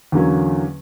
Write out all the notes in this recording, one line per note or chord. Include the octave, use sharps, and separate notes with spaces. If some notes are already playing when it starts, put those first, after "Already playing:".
E2 D3 F#3 A#3 C#4